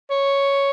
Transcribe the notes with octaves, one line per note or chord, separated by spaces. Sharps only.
C#5